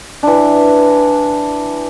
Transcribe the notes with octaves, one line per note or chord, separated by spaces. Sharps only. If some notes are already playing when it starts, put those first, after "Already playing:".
E3 D4